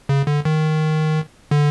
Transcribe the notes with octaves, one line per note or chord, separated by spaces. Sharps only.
C#3
D3
D#3
D3